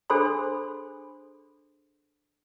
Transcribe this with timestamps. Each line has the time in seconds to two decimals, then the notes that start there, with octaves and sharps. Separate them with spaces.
0.10 D4 G#4 A4 C5 B5 C6